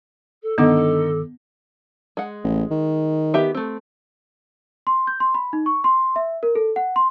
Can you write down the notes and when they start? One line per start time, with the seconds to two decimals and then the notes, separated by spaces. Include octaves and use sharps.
0.42 A4
0.58 G2 D3 D#3 B3 D#4 A4 D6
2.17 G#3 F#5
2.44 A1
2.71 D#3
3.34 B3 G4 E5
3.55 A3 C4
4.87 C6
5.07 G6
5.20 C6
5.34 B5
5.53 D#4
5.66 C#6
5.84 C6
6.16 E5
6.43 A#4
6.55 A4
6.76 F#5
6.96 C6